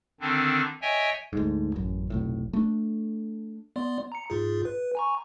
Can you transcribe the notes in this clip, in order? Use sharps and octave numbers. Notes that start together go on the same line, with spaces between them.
D3 D#3 C4 D4
C#5 D#5 E5 G5 G#5
D2 G#2
A1 F#2
F1 B1 A2
A3 D4
B3 D5 C6
A#5 C#7
G#2 F4 G#4
B4
G#5 A#5 C#6